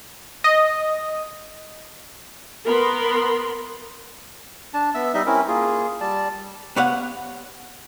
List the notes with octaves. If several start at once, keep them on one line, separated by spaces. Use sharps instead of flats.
D#5
B3 A#4 B5 C6
D4 A5
B3 E5 E6
G3 D#4 D#5 E5
C4 C#4 E4 A#4
A#3 F4 G#4
G3 D5 A5
B3 G4 C#5 F5 F#5